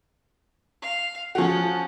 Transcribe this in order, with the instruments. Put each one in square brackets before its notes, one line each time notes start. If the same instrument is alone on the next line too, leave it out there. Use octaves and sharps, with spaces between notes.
[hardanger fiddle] F5
[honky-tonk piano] F3 F#4 [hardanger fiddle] C#4